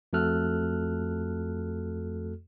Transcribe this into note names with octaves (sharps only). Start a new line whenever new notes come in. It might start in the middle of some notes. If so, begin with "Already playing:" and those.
F2 A3 F#4 A4 F6 F#6